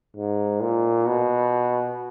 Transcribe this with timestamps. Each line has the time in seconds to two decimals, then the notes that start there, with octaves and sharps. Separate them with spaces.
0.17 G#2
0.62 A#2
1.07 B2